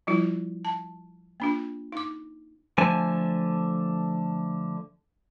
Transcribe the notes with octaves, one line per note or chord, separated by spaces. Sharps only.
F3 G3 E4 F4
A5
A#3 D4 F4
D#4 D6
D3 F3 A3 G#5 A5